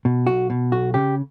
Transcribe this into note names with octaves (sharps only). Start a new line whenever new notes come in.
B2
B1 F#4
B2
B1 F#4
C#3 G4